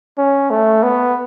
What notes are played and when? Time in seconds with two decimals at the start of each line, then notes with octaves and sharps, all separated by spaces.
0.18 C#4
0.50 A3
0.83 B3